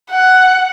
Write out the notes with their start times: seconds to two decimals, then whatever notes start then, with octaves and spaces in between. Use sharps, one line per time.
0.11 F#5